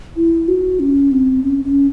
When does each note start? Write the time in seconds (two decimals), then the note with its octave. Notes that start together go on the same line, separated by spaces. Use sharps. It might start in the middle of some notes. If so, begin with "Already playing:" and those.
0.16 E4
0.48 F#4
0.80 C#4
1.12 C4
1.43 C#4
1.64 C#4